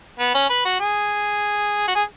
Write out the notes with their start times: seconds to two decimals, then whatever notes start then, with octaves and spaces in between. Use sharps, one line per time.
0.19 B3
0.34 C#4
0.50 B4
0.65 F#4
0.80 G#4
1.88 F#4
1.95 G#4